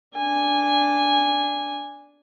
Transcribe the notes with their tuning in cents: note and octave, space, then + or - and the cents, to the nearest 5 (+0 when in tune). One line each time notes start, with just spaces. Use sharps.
D4 -10 G#5 -10